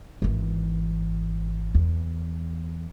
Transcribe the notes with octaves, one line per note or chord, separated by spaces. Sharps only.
G#1 E3
E2